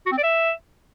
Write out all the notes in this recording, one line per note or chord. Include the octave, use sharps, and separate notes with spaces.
F#4
C4
D5
E5